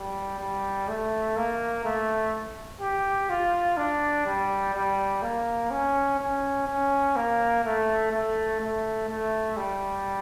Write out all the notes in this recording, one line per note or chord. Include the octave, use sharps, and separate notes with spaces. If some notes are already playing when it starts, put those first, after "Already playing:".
Already playing: G3
G3
A3
A#3
A3
G4
F4
D4
G3
G3
A#3
C#4
C#4
C#4
A#3
A3
A3
A3
A3
G3